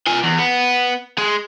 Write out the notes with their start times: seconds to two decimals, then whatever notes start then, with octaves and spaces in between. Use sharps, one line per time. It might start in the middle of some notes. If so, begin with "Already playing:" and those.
0.06 F4 G#5
0.23 E2
0.38 B3
1.18 G#3